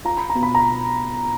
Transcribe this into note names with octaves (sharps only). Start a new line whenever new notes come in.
F4 A#5
B5
A#5
B2
B5
A#5